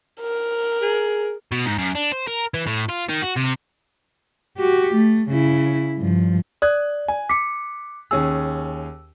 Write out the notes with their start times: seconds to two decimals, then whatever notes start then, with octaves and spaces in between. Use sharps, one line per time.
0.21 A#4
0.82 G#4
1.52 B2
1.66 G#2
1.78 F#2
1.95 D4
2.12 C5
2.27 A#4
2.54 E3
2.67 A2
2.89 F4
3.09 D#3
3.22 F#4
3.36 C3
4.58 F#4 G4
4.95 A3
5.30 C#3 E4
5.98 G2 F3
6.62 D5 D#6 F#6 G#6
7.08 G#5
7.29 D6 B6 C#7
8.11 D#2 C#4 G#4 E6